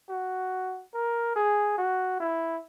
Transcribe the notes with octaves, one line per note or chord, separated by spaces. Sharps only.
F#4
A#4
G#4
F#4
E4